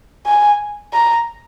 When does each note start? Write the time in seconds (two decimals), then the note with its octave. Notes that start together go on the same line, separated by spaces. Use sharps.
0.26 G#5
0.93 A#5